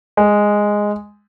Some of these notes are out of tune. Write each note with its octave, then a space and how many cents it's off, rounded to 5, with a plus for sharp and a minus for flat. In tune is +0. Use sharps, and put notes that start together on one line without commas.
G#3 -5